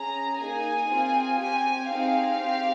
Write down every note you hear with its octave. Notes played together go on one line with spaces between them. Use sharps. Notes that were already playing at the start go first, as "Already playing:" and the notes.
Already playing: C#4 G#4 A#5
A#3 D#4 G#4 G#5
C4 F4 G#4
C4 G4 G#5
C4 D#4 G#4 F5
C4 G4